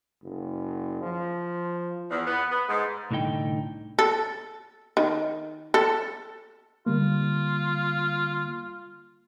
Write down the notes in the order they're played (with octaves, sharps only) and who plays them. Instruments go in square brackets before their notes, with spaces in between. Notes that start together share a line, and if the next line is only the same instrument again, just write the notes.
[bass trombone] F#1
F3
[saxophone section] E2
B3
B3
G#2
[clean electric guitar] C2 A2 D3 D#4 G5
[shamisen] A4
D#3
A4
[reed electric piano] D3 G3 A#3 [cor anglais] F4